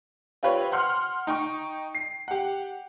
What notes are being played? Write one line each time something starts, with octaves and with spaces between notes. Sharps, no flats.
C4 F4 G4 B4 C#5
F#5 C6 F6
D#4 G5 C#6
C7
G4 F#5